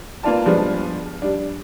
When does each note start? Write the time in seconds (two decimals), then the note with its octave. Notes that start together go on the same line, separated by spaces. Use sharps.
0.23 A#3 B3 F4 D5 A5
0.45 G2 F3 G#3 B3 D4
1.22 G3 D4